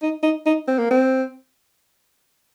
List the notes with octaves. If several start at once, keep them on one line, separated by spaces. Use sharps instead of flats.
D#4
D#4
D#4
C4
A#3
C4